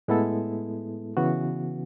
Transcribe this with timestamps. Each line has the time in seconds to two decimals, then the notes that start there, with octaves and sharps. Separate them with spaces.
0.08 A2 G#3 B3 E4 A4
1.17 C#3 E3 B3 F#4